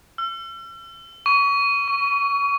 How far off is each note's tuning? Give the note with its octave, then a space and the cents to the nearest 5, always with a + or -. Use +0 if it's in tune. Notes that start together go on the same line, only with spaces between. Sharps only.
E6 +45
C#6 +30
C#6 +15